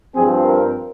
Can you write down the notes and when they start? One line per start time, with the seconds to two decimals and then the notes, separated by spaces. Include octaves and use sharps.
0.14 G2 F3 C4 G#4
0.43 A#4